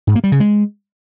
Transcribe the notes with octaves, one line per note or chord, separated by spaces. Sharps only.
G#2
A#3
G3
C#3
G#3